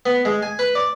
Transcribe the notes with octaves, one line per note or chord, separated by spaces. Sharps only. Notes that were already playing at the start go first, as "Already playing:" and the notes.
B3
G#3
G#5
B4
D5